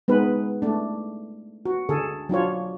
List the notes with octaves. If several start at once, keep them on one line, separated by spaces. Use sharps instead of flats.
G#3 B3 D#4 B4
A3 D4
F#4
D3 G#4 A4
F#3 D4 F4 C#5